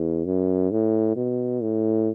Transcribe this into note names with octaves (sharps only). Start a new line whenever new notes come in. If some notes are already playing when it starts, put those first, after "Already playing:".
Already playing: E2
F#2
A2
B2
A2